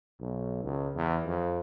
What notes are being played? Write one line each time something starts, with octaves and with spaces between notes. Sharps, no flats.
B1
C#2
E2
F2